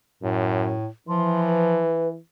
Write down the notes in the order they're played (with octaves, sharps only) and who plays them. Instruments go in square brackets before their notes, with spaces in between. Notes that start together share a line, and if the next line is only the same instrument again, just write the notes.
[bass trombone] F#2 [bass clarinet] A2
[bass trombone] E3 [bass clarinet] F3 [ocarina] C6
[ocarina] B4